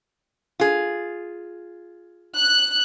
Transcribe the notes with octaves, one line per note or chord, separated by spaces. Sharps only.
F4 G#4
F#6